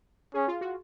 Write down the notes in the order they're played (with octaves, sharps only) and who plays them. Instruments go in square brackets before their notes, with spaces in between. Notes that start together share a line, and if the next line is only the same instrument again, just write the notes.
[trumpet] C#4 [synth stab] G#4
[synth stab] F4
F#4